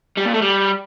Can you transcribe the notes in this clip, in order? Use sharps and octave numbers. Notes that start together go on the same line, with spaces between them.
G3
A#2
A3
G3